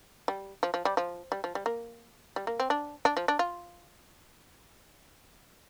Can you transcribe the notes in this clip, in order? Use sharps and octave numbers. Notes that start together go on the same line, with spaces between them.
G3
F3
F3
G3
F3
G3
F3
G3
A#3
G3
A#3
C4
D4
D4
F3
D4
F4